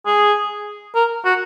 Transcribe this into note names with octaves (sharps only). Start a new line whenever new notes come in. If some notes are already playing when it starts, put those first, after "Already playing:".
G#4
A#4
F#4